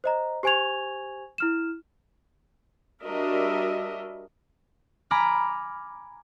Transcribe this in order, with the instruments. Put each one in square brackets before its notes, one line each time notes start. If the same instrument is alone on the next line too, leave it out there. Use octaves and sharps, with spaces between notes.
[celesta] C5 D#5 A#5
G4 C5 G#5 C#6 G#6 F7
E4 F6 E7
[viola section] G3 D4 F#4 A#4 D#5 E5
[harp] G#5 A#5 B5 D6 F6